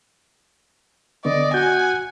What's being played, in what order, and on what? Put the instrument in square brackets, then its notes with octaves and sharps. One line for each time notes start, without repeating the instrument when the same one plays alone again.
[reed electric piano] D3 B3 [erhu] D5 [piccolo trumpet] D#5
[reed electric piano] F#4 G6 [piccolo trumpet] F#5 [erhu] G#5